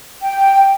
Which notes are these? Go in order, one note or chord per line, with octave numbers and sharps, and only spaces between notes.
G5